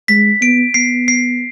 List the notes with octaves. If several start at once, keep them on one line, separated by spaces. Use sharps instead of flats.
G#3 B6
B3 D7
B3 C7
C7